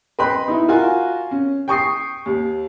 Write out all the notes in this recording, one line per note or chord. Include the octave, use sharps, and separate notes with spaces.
B4 D#5 G5 B5 C6
D#4 E4
F4 F#4 A#4 G#5
C#4
G5 C#6 D#6 C7
D#2